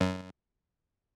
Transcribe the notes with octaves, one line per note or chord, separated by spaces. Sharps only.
F#2